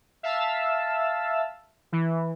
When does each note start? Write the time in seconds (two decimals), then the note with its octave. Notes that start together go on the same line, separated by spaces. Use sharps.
0.23 E5 F5 A5 E6
1.92 E3